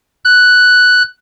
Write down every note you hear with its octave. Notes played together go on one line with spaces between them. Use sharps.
F#6